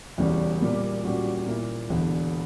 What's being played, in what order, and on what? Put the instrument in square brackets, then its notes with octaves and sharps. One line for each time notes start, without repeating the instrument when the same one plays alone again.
[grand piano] E1 E2 C#3 G3 C#4
A#2 G3 A#3
A#2 G3 C#4 F#4
A#2 A#3 E4
E1 E2 D3